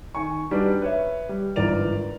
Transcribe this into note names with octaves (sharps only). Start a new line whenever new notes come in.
D#3 G#5 C#6
G3 D4 D#4 F#4 B4 D5
B4 C#5 E5
G3
G1 G#2 E3 A#4 D5 F7